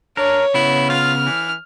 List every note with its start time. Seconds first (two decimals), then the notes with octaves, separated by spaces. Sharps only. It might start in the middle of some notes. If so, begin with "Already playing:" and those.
0.17 D4 A#4 C#5
0.54 C#3 B3 E4
0.90 F4 F6
1.25 E3